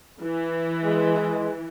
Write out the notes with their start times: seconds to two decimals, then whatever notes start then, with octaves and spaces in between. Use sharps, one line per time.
0.23 E3
0.83 G#3